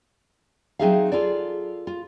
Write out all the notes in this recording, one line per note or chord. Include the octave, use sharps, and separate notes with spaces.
F#3 C4 D#4 G#4 E5 F5
F4 G#4 A4 D5
F4